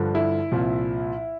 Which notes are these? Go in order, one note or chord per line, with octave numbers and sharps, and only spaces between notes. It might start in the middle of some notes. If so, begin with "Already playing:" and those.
Already playing: G2 D3 F3
E4
C2 A#2 F3